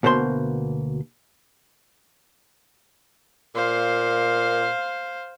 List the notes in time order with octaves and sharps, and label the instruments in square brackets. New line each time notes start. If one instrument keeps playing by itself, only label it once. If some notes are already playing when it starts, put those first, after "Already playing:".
[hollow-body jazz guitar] D2 B2 A#3 C5 C6
[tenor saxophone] A#2 [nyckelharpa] C5 F5